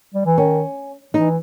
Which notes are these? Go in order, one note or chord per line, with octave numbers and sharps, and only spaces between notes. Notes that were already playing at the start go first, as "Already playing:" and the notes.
G3
E3
D#3 C#4
E3 D#4